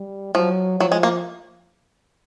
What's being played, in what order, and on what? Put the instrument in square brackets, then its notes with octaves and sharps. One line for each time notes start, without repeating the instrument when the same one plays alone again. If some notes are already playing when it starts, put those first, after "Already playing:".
Already playing: [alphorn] G3
[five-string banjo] F3 [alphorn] F#3
[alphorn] F3 [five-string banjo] F#3
[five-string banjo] G#3
A#3